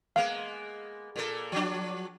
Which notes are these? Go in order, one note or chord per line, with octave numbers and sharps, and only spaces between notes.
G#3 A#3 B3 F5
A#2 A#3 A4
F3 F#3 D4